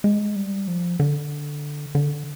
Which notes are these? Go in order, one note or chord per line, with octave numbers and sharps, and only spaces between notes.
G#3
G3
F3
D3
D3